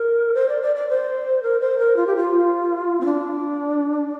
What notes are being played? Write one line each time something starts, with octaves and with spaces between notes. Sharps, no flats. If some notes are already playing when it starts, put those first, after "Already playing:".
Already playing: A#4
C5
D5
D5
D5
C5
A#4
C5
A#4
F4
G4
F4
C4
D4